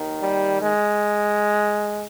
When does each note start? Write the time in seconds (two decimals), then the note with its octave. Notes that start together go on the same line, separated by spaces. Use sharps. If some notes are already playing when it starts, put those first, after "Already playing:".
Already playing: D#2 D#3
0.21 G3
0.61 G#3